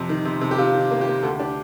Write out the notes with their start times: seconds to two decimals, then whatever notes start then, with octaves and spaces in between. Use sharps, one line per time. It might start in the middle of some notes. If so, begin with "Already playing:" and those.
Already playing: F2 C3
0.09 D#3
0.25 C3
0.41 C3
0.51 G4
0.58 C3 F4
0.74 D#3
0.91 A#3
1.01 G4
1.07 A#3
1.23 D2 A4
1.39 D4 G4